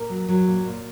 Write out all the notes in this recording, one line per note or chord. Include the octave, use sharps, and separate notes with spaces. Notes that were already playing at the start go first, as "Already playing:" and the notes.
Already playing: A#2 A#4
F#3
F#3
A#2
A#2